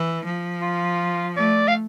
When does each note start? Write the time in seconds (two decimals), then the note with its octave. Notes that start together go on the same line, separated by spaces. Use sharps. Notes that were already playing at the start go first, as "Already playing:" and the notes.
Already playing: E3
0.25 F3
0.62 F4
1.37 A3 D5
1.68 F5